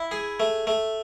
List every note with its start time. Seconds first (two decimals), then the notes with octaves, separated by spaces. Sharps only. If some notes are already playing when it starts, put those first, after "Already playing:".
Already playing: E4
0.11 G#4
0.40 A3
0.67 A3